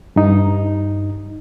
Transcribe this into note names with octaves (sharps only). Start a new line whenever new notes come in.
G2 D#4